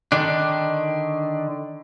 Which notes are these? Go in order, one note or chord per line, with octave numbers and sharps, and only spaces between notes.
D3 D#3 D4